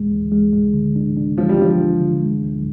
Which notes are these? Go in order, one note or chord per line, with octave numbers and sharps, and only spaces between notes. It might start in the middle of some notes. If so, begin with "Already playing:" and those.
Already playing: D2 G#3
D2
G#3
G#3
D3
D4
D4
F3 G#3
G3
F3 D4
D4
D3
G#3
D2